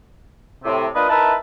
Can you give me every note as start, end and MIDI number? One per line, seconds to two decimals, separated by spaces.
0.64 0.88 45
0.64 0.88 48
0.95 1.07 58
0.95 1.07 62
0.95 1.07 65
0.95 1.07 71
0.95 1.07 75
1.09 1.35 63
1.09 1.35 64
1.09 1.35 70
1.09 1.35 71
1.09 1.35 76
1.09 1.35 81